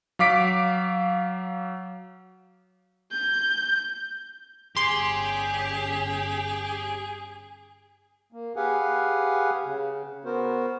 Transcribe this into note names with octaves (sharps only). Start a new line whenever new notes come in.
F#3 F5 D6 B6 D7
G6
G1 C#4 G4 G#4 C6
A#3
G4 G#4 B4 F5 F#5 G#5
C#3
B3 F#4 A#4 C5